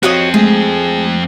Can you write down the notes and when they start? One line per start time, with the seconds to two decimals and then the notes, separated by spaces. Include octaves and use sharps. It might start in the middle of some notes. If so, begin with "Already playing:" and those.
0.03 F2 C4 F#4 C#5 D#5
0.34 G#3 A3 G#4